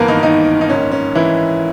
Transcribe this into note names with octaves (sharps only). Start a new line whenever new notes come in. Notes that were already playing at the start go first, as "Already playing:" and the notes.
Already playing: G#1 G2 E3 A#3 B3 A#4 B4
D#3 D#4
D#3 D#4
D#4
A#1 G#2 D#3 C#4
C#4
E3 E4